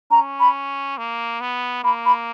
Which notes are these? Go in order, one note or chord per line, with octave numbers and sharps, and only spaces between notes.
C#4 A#5
B5
A#3
B3
A#3 B5
B5